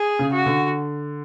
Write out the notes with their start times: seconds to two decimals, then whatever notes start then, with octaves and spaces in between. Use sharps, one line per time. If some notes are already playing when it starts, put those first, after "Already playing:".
Already playing: G#4
0.19 C#3
0.33 F#4
0.46 D3